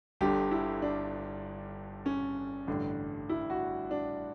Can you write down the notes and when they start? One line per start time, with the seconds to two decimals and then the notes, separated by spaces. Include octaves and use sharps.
0.21 G1 G2 D3 G4
0.51 E4
0.82 D4
2.06 C#4
2.67 A1 G2 D3
3.29 E4
3.50 F#4
3.91 D4